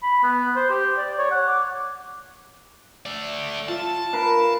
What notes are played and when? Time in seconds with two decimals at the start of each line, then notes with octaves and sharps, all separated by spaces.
0.03 B5
0.23 B3
0.56 C5
0.70 G4
0.98 D5
1.18 C#5
1.31 F#5
1.48 D6
3.06 A3 D5
3.68 F4 E5 A5
4.13 A#4 B4 F5